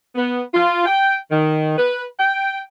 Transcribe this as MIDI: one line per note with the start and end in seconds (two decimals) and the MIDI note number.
0.16 0.41 59
0.54 0.86 65
0.86 1.15 79
1.31 1.75 51
1.78 2.02 71
2.18 2.60 79